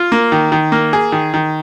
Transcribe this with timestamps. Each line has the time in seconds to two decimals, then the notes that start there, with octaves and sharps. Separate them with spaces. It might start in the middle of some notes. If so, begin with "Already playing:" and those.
Already playing: F4
0.12 A#3
0.32 D#3
0.52 D#3
0.72 A#3
0.93 G#4
1.12 D#3
1.34 D#3